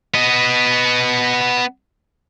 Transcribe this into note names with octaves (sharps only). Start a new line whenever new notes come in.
B3 D#5